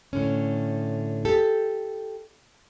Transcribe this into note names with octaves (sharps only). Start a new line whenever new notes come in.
A2 D3 C#4
G4 A4